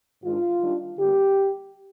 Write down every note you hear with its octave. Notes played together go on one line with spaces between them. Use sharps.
G#2 D#3 G#3 D4 F4
D#3 G3 D4
D3 G3 A#3 G4